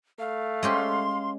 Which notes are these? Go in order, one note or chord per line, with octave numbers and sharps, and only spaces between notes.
A3 F5
G#3 C#4 G4 C6